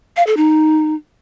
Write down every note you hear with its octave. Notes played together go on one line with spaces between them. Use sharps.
F5
A4
D#4